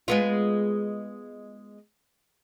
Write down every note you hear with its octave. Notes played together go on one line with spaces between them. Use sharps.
G#3 B3 F4